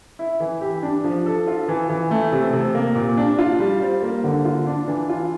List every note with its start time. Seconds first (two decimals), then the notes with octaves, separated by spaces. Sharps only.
0.19 E4
0.40 E3
0.61 G4
0.83 D4
1.04 F3
1.26 A4
1.47 F4
1.68 E3
1.89 E3
2.11 A3
2.32 C3
2.53 C3
2.75 A#3
2.95 A#2
3.17 D4
3.38 F4
3.59 G3
3.81 C5
4.02 A#3
4.24 D3
4.45 F4
4.67 D4
4.87 E3
5.09 F4